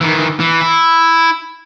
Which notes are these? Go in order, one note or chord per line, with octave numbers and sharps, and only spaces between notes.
D#3 E3
E3
E4